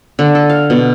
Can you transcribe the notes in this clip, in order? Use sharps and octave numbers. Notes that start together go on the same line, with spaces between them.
D3
A4
F5
B2